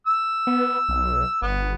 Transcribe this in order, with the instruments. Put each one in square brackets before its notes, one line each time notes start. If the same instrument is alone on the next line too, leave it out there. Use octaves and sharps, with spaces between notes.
[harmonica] E6
[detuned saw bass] B3
B1
[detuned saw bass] G1 [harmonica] B3